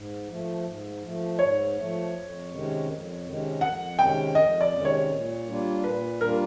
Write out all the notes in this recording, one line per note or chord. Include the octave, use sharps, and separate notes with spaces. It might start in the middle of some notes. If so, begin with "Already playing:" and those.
Already playing: G#2
F3 A3
G#2
F3 A3
G#2 C#5
F3 A3
F2
C3 D#3 G#3 C#4
F2
C3 D#3 G#3 C#4
F2 F#5
C3 D#3 G#3 C#4 G5
F2 D#5
D5
C3 D#3 G#3 C#4
C#5
A#2
G3 A#3 D4 F4
A#2 B4
G3 A#3 D4 F4 A#4